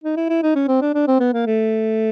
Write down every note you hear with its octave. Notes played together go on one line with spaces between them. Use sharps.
D#4
E4
E4
D#4
C#4
C4
D4
D4
C4
B3
A#3
A3